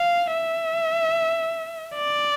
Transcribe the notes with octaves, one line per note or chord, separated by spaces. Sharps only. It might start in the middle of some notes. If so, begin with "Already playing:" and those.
Already playing: F5
E5
D5